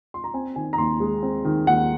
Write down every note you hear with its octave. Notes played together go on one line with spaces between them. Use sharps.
C6
A#5
C4 G#5
D#3 G#5
A#5
D#2 C6
G#3
C4
D#3
D#2 F#5